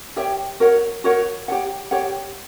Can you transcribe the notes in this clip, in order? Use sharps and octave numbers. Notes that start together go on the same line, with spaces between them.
G4 C#5 E5 G5
F#4 A#4 C#5 F#5
F#4 A#4 C#5 F#5
G4 C#5 F#5
G4 C#5 F#5